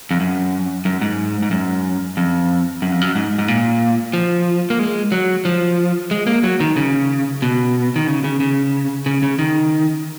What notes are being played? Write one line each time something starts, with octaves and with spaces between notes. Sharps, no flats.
F2
F#2
F#2
G#2
G#2
F#2
F2
F#2
F2
F#2
G#2
G#2
A#2
F3
A#3
G#3
F#3
F3
G#3
A#3
F#3
D#3
C#3
B2
D#3
C#3
C#3
C#3
C#3
C#3
D#3